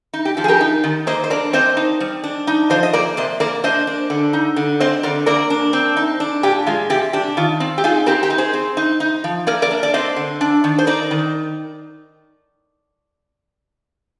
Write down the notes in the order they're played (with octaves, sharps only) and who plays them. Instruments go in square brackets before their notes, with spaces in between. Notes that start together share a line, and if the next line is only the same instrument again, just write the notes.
[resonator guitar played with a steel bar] D#4
G4
F3 G4
G#4
G4 A#4
D#4
D#3
A#3 C5 D#5
C5
D4 A#4 D5
C4 C5 D#5
D#4
G3
D4
D#4
F3 C5 D#5
D#5
A#3 A#4 D5
C3 C5 D#5
A#3 A#4 D5
D4 C5 D#5
D4
D3
D#4
D3
C4 C5 D#5
D3 A#4 D5
A#3 A#4 D5
D4
C4
D#4
D4
A#2 G4
G#3 F4
C3 G4
D4 G4
D#3 F4
C4
G4
D#4 F4 G#4
C4 G4 A#4
G4 A#4
D#4
G#4 C5
C4
D#4
D#4
F3
A#3 A#4 D5
A#4 D5
D4
D5
C4 C5 D#5
D3
D4
D#3
C5
D#4 A#4 D5
D#3